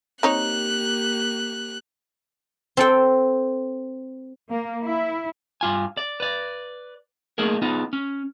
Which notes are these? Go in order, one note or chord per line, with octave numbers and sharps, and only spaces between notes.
A#3 C4 D#4 G4 C#5 F#6
C4 A4 G5
A#3
E4
G2 F4 G#5
D5
B4 D5
A3 A#3 D#4 G#4 A#4
B3 D#4 F4 G#4
C#4